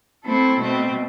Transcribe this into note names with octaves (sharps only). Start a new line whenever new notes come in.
A3 C4 E4 A4
B2 A3 C4